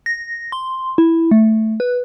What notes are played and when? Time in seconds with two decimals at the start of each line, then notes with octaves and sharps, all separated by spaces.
0.06 A#6
0.52 C6
0.98 E4
1.31 A3
1.80 B4